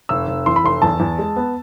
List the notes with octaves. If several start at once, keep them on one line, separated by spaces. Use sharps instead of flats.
F1 E6
F1
E3 C6
B5
F1 C6
E2 A5
E2
G#3
B3